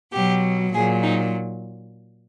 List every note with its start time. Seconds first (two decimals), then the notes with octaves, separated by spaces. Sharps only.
0.12 B2 F#3 G4
0.73 A#2 F#3 G#4
1.02 D#4